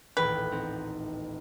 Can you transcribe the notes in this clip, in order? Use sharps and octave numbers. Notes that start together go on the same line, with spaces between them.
D#1 A1 B4 G5
B3 C4 D#4